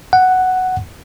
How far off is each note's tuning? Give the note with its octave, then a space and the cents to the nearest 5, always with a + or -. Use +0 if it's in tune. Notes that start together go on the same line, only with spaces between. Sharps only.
F#5 +5